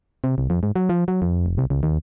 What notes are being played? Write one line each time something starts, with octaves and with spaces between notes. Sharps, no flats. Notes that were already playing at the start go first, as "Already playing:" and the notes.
C3
C2
F2
G#2
F#3
F3
F#3
F2
F1
C2
C#2
D#2